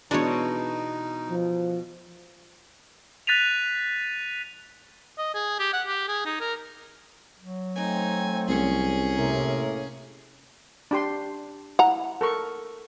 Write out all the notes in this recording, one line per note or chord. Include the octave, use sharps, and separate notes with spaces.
B2 E3 G#3 D4 D#4 C#5
F3
F#6 A6 B6 D#7 F7
D#5
G#4
G4
F#5
G4
G#4
D#4
A#4
F#3
A3 C4 D#4 G#5
C2 C#4 G#4
A2 C3 A#3 A#4
D4 G4 C6
E4 F#5 A#5
A4 A#4 C#6